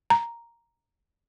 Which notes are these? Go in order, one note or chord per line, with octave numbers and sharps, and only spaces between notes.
A#5